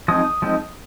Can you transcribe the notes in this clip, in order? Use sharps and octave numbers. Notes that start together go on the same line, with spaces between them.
F3 G#3 C4 D#4 D#6
F3 G#3 C4 D#4